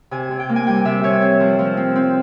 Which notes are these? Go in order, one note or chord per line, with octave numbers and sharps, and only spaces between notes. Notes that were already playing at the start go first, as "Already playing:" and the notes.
C3 G#5
C3
G5
A#3
G#5
G3 G5
C3 E5
C3 C#5
C4
F3
F3
C4
C4